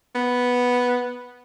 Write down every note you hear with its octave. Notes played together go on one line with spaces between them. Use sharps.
B3